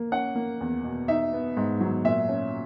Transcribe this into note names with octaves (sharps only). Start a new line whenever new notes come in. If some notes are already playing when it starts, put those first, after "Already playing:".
Already playing: A#3
C#4 F#5
A#3
E2
B2
D#4 E5
B3
G#2
F#3
A#2 E5
C#4